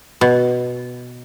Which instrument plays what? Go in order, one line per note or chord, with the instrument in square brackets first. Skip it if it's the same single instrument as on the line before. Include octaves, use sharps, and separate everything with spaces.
[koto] B2